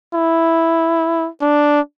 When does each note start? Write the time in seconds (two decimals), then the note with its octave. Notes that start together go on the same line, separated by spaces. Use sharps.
0.14 E4
1.42 D4